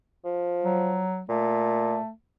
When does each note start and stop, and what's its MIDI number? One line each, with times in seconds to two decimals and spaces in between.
0.25 1.05 53
0.65 1.22 54
1.29 1.97 46
1.29 2.10 57